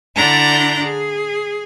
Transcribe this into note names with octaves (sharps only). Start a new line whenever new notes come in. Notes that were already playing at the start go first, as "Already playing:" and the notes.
D3 D4 E4 D5 A#5 G6
G#4